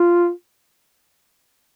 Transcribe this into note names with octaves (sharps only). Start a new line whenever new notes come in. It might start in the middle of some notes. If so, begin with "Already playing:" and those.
Already playing: F4